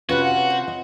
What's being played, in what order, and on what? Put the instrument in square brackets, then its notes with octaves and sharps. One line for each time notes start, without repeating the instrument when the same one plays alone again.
[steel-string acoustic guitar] C3 C#4 [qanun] C4 F4 [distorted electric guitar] F#4 [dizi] B4
[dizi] F#5
[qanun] C5
[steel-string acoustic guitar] D#5